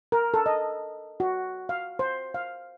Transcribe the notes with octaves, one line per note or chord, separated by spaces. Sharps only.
A#4
A4
D#5
F#4
F5
C5
F5